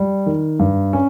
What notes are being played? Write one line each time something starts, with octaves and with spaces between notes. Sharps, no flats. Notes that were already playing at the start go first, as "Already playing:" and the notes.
Already playing: G3
D#3
G2
C#4